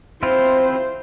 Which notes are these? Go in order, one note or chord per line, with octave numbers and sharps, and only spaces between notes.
C4 E4 F4 C5